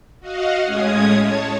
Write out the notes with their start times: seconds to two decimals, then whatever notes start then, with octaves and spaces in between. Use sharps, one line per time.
0.20 F#4 D#5 F5 F#5
0.64 A2 G#3 C#4 D#6 G#6
1.19 C#5 A5